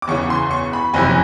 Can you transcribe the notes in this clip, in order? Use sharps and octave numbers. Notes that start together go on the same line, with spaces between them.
D6
E2 C#3 E3 C#6
C6
C#6
B5
F#1 F2 C3 E3 G#5